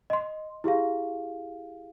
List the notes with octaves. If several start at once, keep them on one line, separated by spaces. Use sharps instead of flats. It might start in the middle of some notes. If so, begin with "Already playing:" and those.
D#5 C6
E4 G4 G#4 F5